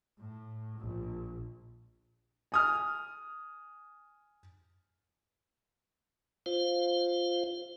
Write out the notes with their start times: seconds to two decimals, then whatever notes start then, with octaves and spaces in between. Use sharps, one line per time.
0.19 A2
0.78 A#1
2.52 G#5 D#6 F6
6.46 F4 C5 F5